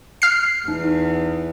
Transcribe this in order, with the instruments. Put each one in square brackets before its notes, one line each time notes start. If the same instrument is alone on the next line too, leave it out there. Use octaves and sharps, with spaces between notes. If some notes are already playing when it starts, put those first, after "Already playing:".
[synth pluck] F6 C7
[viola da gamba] E2 [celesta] D#4